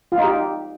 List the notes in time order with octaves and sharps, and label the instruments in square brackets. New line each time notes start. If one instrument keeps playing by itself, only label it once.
[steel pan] F4
D#4
G4